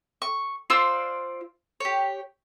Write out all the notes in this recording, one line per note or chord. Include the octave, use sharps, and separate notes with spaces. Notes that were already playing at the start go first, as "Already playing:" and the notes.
C#6
F4 C5 D5 E6
G4 C#5